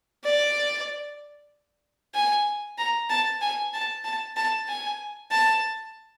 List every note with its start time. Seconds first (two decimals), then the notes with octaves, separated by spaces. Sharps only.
0.25 D5
2.15 G#5
2.78 A#5
3.10 A5
3.41 G#5
3.74 A5
4.04 A5
4.37 A5
4.69 G#5
5.31 A5